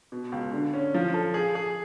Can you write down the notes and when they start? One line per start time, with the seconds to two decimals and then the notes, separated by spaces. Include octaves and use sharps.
0.12 B2
0.32 C#2
0.53 D3
0.73 C#4
0.94 F3
1.14 A4
1.34 G#4
1.55 G#4